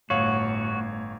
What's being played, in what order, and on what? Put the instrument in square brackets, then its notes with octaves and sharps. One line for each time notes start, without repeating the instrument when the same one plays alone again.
[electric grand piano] G1 C#5 F5 [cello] A2 [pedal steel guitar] F#4